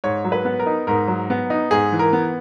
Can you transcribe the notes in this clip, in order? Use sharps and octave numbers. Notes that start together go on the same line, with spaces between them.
G#2 C#5
F#3
B4
B3
A#4
D#4
G#2 A#4
F#3
B3
D#4
G#2 G#4
E3
A#4
B3